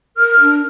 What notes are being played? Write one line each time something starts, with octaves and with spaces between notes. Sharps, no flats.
A#4 F6
D4